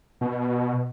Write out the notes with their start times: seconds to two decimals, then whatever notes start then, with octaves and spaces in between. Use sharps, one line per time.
0.21 B2